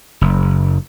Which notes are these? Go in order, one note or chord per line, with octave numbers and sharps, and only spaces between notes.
F#1